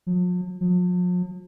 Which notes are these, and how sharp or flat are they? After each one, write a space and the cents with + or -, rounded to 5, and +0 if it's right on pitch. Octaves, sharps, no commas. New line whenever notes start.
F3 +45
F3 +45